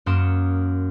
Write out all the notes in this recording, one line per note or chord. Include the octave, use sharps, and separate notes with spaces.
F#2 A#3 C6 D#6 C#7 E7